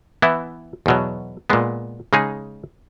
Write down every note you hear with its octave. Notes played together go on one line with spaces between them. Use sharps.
E3 B3 E4
E2 B2 F#3
A#2 G#3 B3
C#3 G#3 D#4 G#4